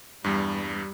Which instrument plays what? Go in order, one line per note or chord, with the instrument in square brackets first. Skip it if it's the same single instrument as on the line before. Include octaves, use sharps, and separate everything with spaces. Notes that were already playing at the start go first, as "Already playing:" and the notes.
[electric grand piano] E2 G2 [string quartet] G3